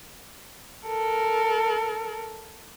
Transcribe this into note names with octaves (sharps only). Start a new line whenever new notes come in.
A4 A#4